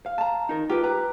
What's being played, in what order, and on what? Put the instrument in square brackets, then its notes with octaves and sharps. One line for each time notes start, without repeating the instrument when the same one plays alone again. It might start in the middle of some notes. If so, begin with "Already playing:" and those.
[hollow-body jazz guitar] F5
[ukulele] A5 A#5
[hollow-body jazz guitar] D#4 A#4
[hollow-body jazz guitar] F4 B4 [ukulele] G4
[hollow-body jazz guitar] B4 [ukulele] A#5